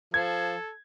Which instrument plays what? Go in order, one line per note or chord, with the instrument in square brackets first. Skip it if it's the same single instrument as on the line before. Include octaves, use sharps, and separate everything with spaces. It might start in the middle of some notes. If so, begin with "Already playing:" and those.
[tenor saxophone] F3 [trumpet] A4 [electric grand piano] G#6